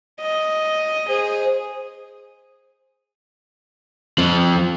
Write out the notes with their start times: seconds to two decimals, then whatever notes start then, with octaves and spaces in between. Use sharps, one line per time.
0.21 D#5
1.09 G#4 C5
4.18 F3 C4